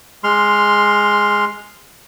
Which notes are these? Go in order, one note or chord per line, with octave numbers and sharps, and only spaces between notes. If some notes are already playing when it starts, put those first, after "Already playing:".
G#3 C6 F6